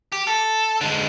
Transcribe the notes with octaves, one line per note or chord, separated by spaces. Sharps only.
G4
A4
D3 G#3